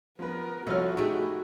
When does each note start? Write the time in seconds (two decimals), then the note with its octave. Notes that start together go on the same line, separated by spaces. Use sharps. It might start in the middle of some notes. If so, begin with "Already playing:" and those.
0.19 F3 B3 A#4 B4
0.66 C2 F3 F#4 A4 C#5 D#5 F6
0.97 A3 D#4 E4 G4 G#4